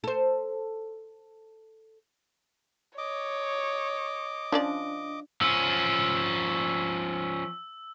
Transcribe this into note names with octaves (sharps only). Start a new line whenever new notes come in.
A4 C5
C#5 D#5 D6
F3 C#4 D4 D5
F3 C#4 E6